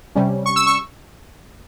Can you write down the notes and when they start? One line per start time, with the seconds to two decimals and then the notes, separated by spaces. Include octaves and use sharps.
0.15 C3 G3 C#4
0.46 C#6
0.56 E6
0.67 C#6